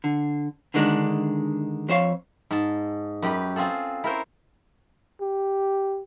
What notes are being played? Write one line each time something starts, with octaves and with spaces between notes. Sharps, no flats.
D3
D3 D#3 G#3 D4
F2 C5 C#5 F5
G#2 A5
F#2 G4 B4
C4 F4 G#4 A4
E4 A#4 C5 C#5
G4